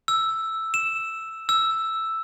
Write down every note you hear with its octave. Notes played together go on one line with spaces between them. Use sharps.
E6
E7
E6